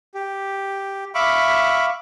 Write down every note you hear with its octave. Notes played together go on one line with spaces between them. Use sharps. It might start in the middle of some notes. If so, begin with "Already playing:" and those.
G4
E5 F5 B5 C#6 D6